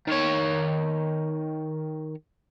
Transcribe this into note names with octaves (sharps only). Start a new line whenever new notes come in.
D#3 C#5